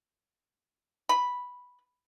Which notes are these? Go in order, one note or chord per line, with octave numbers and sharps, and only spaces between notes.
B5